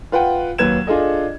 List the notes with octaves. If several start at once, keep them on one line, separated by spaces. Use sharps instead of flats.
F4 B4 F#5 G5
D#2 F#3 B4 G#6 E7
D4 F4 G#4 A4 D#5